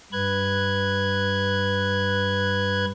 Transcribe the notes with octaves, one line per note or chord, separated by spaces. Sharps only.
G2 B4 F#6 G#6